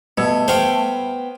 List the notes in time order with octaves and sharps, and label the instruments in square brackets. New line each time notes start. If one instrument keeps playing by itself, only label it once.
[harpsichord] B2 [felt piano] G3 E6 G#6 [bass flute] A3
[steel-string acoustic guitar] B3 G5 [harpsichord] C5 F5 C#6